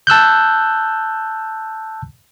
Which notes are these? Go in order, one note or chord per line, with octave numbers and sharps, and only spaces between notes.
A5 E6 F#6 G6